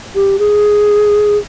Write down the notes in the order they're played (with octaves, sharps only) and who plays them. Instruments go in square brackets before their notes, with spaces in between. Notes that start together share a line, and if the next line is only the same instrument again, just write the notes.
[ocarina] G4
G#4